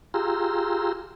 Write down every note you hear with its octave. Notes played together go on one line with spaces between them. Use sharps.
F4 G4 G#4 A#5 C6 E6